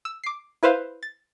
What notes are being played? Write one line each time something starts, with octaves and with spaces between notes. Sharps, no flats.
E6
D6 C7
E4 B4 C5 F5
A6